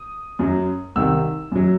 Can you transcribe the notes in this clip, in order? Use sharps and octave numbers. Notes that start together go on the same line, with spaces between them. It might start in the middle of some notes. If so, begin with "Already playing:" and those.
Already playing: D#6
F#2 F#3
C2 C3 D#3 E6
F#2 F#3